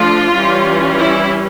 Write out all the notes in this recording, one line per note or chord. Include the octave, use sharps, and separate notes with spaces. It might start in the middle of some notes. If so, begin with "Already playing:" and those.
Already playing: F3 A3 D4 F4
E3 G3 C#4
E4